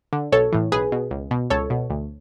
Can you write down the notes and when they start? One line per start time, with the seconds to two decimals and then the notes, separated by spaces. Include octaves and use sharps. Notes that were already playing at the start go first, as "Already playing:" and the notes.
0.13 D3
0.32 B1 A4 C#5
0.53 A2 E3
0.72 B1 G#4 B4
0.92 B2
1.11 C#2
1.31 B2
1.50 C#2 A4 C#5
1.70 B2
1.90 D2